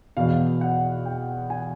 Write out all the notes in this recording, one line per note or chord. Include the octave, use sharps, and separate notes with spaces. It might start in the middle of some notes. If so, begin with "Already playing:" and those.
E2 B2 F5
F#5
G5
G#5